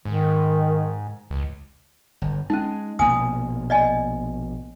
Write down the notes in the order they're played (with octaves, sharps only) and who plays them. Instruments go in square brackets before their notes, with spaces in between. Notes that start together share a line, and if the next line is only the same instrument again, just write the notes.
[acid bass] G#2 [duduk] D#3
[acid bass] C#2
[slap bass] G1
[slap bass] G#3 [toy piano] C#4 D#4
[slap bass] A#1 B2 A#3 [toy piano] G#5 D#6
[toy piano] D5 D#5 G#5